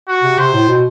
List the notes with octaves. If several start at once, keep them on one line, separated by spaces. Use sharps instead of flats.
F#4
C3
C3 C5
A2
B2